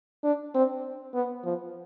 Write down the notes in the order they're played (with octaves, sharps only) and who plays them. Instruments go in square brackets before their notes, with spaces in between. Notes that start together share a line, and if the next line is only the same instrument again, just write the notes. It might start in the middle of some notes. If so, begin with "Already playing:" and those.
[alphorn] D4
C4
B3
F3